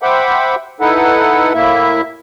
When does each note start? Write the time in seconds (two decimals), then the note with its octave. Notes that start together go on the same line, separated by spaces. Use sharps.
0.02 C5 E5 F#5 G5 B5 D6
0.80 D#4 E4 A4 B4 F#5
1.54 A2 A#3 E4 E5